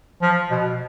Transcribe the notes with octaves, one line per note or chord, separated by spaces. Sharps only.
F3
B2